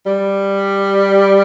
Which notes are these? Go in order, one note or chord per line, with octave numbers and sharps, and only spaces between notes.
G3